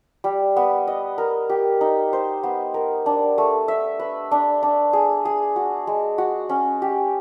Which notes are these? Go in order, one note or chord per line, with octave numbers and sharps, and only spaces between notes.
G3
B3
D#5
A#4
G4
D#4
C5
B3
A#4
D4
A3
E5
B4
D4
D4
G#4
G#4
F#4
G#3
F#4
C#4
G4